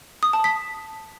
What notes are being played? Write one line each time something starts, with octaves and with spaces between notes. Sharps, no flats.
D#6
A5
B6